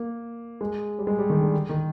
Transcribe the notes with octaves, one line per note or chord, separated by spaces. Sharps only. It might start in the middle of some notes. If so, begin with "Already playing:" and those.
Already playing: A#3
G#3
G3
G#3
G3
D#3
D3
D#3